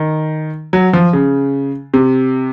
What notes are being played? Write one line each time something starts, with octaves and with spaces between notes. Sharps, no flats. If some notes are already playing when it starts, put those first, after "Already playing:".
Already playing: D#3
F#3
F3
C#3
C3